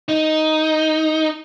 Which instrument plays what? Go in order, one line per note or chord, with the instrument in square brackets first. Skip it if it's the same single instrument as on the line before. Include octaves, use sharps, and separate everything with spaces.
[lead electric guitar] D#4